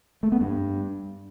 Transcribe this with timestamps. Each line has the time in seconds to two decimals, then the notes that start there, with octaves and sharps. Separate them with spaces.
0.23 A3
0.32 B3
0.41 G2